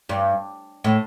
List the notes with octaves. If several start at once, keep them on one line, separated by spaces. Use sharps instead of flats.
G2
A2